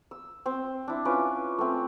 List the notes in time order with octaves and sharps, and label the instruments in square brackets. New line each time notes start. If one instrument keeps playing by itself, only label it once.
[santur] E6
C4 C5
D4 E4
C#4 F4 B4 D6
A3 C4